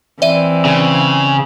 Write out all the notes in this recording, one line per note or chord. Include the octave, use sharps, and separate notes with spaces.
E3 C4 D5 E5 D#7
C#3